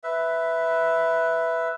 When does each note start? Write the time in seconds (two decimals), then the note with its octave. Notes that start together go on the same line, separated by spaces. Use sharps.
0.03 B4 E5